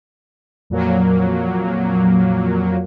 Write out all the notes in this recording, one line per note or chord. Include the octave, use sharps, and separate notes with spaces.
F2 A#2 F#3 A#3